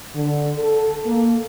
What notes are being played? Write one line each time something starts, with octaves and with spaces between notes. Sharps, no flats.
D3
A4
A#3